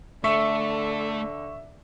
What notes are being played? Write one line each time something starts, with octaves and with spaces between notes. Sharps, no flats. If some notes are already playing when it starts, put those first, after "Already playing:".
D3 A3 E5 C#6